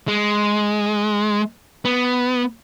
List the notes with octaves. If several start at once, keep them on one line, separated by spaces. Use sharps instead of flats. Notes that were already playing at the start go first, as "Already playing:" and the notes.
G#3
B3